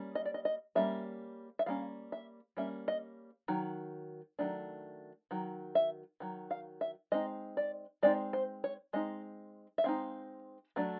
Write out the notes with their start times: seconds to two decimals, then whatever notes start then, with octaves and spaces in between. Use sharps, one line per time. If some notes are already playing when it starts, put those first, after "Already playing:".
Already playing: G3 A#3 C#4
0.15 D#5
0.25 D5
0.34 D#5
0.45 D#5
0.75 G3 A#3 C#4 E5
1.59 E5
1.66 G3 A#3 C#4 F5
2.12 E5
2.57 G3 A#3 C#4 E5
2.88 D#5
3.48 D#3 F#3
4.39 D#3 F#3 A3 D4
5.31 D#3 F#3
5.75 E5
6.20 D#3 F#3
6.51 F5
6.81 E5
7.12 G#3 C4 D#4 D#5
7.57 D5
8.03 G#3 C4 D#4 D5
8.33 C5
8.64 C#5
8.93 G#3 C4 D#4 D#5
9.78 E5
9.84 G#3 C4 D#4 F5
10.76 F#3 A3 D4